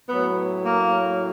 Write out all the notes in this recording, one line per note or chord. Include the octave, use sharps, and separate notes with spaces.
A2 F#3 B3
A#3